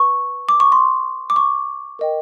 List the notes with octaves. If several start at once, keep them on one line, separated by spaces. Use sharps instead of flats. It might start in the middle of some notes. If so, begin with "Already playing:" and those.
Already playing: B4 C#6
D6
C#6
C6
D6
C#6
A#4 D#5 G5